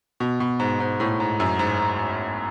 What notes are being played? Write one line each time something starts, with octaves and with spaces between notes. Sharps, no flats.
B2
B2
G#2
G#2
A2
G#2
F#2
G#2